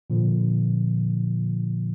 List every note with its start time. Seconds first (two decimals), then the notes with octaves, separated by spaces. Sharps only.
0.10 A#2 D3 F3